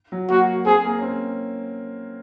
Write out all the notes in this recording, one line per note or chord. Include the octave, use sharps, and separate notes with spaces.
F#3
A#3 F#4
C4 G#4
A#3
C#4
C4